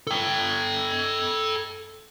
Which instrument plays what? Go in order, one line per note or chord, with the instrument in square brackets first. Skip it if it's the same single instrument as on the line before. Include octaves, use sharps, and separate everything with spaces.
[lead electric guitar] A4 G5